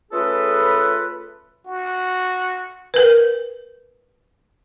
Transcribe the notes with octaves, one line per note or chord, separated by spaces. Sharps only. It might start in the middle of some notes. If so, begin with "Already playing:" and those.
A3 C#4 F4 G#4 A4 B4
F#4
A#4 B4